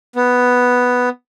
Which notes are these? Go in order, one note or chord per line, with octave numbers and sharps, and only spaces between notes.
B3